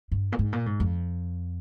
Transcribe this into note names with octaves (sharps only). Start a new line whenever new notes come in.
G2
A#2
G#2
A#2
G#2
F2